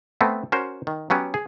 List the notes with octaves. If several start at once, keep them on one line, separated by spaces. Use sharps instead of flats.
A3 B3 C4 B4
C#4 F#4 A#4 C5
D#3
F#3 B3 C#4 G4
G#4